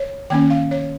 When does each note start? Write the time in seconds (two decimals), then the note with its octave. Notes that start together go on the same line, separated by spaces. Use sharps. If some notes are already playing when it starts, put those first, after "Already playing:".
Already playing: C#5
0.30 D#3 A#3 C#4 G5
0.50 F5
0.71 C#5